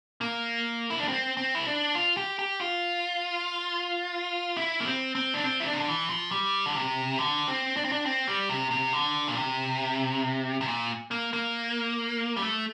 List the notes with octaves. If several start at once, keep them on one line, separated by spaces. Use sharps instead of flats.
A#3
E4
D4
C4
C4
E4
D4
F4
G4
G4
F4
E4
A#3
C4
C4
D4
C4
E4
D4
C3
D3
E3
F3
G3
D3
C3
D3
C4
D4
C4
D4
C4
G3
C3
C3
D3
A#2
C3
C3
A#2
A#3
A#3
G3
A3